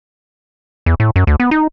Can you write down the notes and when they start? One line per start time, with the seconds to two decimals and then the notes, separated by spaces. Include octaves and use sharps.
0.86 E2
1.00 A2
1.16 F#2
1.27 D2
1.40 B3
1.51 D#4